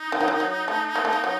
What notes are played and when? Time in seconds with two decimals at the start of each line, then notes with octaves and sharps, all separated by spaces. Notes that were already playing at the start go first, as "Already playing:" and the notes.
Already playing: D#4
0.12 D#3
0.21 F#3
0.28 D#3
0.40 F#3
0.68 A3
0.95 A#3
1.05 A3
1.13 A#3
1.24 F#3